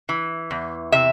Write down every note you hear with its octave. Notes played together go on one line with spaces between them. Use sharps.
E3
E2
C3 E5